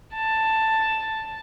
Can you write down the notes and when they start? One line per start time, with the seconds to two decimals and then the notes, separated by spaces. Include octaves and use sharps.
0.16 A5